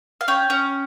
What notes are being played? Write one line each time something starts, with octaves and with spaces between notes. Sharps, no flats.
F5
C#4 G5
C#4